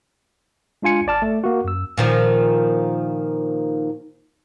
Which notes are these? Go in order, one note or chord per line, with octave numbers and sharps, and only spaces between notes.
G#3 D4 F4 G#5 C#7
G#1 D5 A5 F6
A3
A#3 F#4
F#2 E6
A#2 D#3 F3